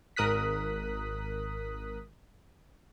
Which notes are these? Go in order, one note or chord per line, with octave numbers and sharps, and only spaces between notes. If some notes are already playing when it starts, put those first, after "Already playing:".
G#1 A#4 D#6 F#6 B6